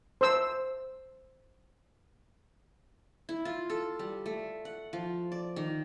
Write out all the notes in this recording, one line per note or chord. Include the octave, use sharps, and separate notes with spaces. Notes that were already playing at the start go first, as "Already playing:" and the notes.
C5 E6
E4
F4
A4
G3
A3
F#5
F3
D5
D#3